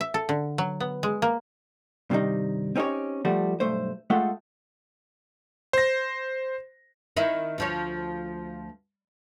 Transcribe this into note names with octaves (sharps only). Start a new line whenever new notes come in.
E5
A4
D3
F#3
B3
G#3
A#3
G2 C3 D#3 G3 D#4
C4 C#4 D#4 G4 C#5
F3 G3 A3 F#4
B1 G2 A3 C5
G#3 A3 F4 A4 F#5 G5
C5 A#6
D#3 D#4 E4
D2 F3 C#5